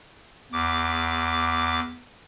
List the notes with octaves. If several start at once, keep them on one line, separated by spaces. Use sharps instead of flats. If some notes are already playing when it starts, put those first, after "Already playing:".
E2 D6